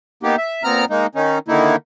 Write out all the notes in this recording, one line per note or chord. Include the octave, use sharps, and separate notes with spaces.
A#3 B3 D#4 G4
E5
A#2 B3 C4 A#5 F6
G#3 A#3 D#4
D#3 C#4 D#4
D3 D#3 A#3 D#4 E4